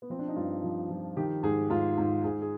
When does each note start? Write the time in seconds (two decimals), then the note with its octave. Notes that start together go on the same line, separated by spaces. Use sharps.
0.02 B3
0.10 F3 C4
0.19 D4
0.28 D#4
0.36 G2 F4
0.64 F3
0.90 F3
1.17 D#3 G4
1.43 G#2 G#4
1.70 G#2 F4
1.98 G#2
2.24 G#2 G#4
2.42 G#4